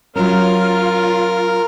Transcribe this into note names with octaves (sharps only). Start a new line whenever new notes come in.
F#3 C#4 F4 A#4